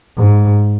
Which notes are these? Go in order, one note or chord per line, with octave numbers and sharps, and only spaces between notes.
G#2